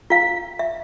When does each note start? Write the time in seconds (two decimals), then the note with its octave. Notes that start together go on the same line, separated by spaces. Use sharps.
0.10 F4 F5
0.59 E5